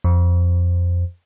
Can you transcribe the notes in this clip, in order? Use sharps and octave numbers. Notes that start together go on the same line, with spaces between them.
F2